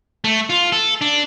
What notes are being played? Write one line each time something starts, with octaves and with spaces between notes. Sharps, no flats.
A3
F4
A4
D4